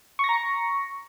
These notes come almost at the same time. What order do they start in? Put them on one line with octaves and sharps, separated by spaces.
C#6 A#6 A#5 C#7